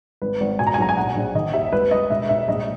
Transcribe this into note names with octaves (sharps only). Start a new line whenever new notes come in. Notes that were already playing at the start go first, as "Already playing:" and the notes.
G#1 B4
G#1
B2 G#5
A#5
G#5
B1 A#5
G#5
A#1 F#5
A#1
D#3 D#5
D#2 E5
G#1 B4
G#1 D#5
E1 E5
E1 E5
A#1 D#5